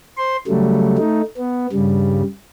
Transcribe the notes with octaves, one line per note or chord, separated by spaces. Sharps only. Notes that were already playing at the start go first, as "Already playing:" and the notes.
C5 C6
C#3 F#3 G3 A3
A3 D#4
B3
G2 C#3 G3